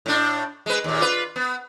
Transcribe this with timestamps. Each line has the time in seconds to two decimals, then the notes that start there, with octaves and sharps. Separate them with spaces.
0.06 A2 D4
0.66 G#3 B4
0.84 D#2 A#2
1.01 F4 B4
1.36 B3